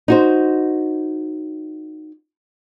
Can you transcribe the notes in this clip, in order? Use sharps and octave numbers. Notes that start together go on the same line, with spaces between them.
D#4 F#4 C5